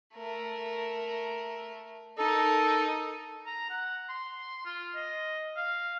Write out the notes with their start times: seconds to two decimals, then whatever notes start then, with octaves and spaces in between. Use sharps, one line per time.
0.15 A3 A#4
2.18 D#4 A4 A#4
3.46 A#5
3.70 F#5
4.09 C6
4.65 F4
4.95 D#5
5.57 F5